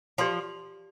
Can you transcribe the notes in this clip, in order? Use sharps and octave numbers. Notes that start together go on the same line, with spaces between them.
F3 G4 D5 A5 C6